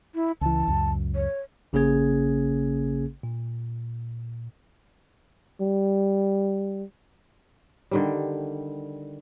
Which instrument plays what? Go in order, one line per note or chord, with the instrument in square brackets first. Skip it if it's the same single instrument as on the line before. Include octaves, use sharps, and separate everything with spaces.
[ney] E4
[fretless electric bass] C#2 E3 [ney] A5
[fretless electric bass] C#2 F#2
[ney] C#5
[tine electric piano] A1 C#3 A#3 C#4 G#4 G#6
A#2
[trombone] G3
[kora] D3 D#3 G3